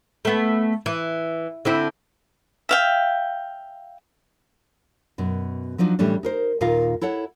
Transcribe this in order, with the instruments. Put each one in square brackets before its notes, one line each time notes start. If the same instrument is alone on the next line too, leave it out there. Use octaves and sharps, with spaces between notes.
[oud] A3 B3
E3
D3 C4 E4
[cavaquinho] E5 F5 G5
[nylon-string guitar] F#2 B2
F3 F#3 D4 D#4
A2 E3 G3 A3 C#4 D4
D#4 A#4 C5
D#2 A#2 D#4 F4 A#4 F5
E4 A4 C#5 F#5